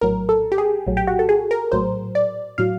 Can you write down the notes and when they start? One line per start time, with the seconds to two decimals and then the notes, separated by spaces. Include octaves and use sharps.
0.01 A#1 A2 F#3 A#4
0.29 A4
0.52 G4
0.58 G#4
0.87 A#1 A2 F#3
0.97 G4
1.07 F#4
1.19 A4
1.29 G#4
1.51 A#4
1.72 A#1 A2 F#3 C5
2.15 D5
2.58 A2 F#3 F5